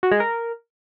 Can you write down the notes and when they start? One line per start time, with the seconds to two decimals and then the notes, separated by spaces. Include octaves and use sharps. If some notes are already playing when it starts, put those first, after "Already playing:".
0.03 F#4
0.12 G#3
0.20 A#4